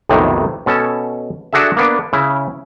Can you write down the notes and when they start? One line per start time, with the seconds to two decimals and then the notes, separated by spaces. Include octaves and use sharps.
0.09 B1 F2 A2 C3 D#3 F#3
0.66 B2 C#4 A4
1.53 D4 F#4 G#4 A4 E5
1.77 A#3 B3 D4
2.13 C#3 E4